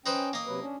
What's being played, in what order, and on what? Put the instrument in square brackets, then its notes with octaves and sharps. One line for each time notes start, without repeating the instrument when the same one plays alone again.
[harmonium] C#4 G5 [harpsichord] D#4 B4 C5
[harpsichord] A#3 D#5
[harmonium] C3 F#3 B4
C#4 D4